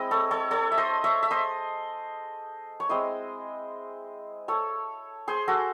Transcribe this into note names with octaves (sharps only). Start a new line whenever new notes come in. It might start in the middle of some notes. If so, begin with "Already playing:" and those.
Already playing: G#3 C4 E4 D#5
A4 C#5
A4 C#5
A4 C#5
E5
C5 D#5
C#5 E5
E5
C5 D#5
C#5
G#3 C4 E4 C5 D#5
A4 C#5
G#4 C5
F#4 A4